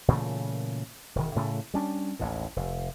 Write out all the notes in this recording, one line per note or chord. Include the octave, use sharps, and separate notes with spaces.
A#2 C#3 E3 A3
E1 D#3
A2 C#3 A3
G3 C#4 D4
A1 D#2 A2
F1